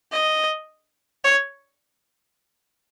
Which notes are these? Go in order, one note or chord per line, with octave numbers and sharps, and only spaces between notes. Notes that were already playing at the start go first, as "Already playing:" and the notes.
D#5
C#5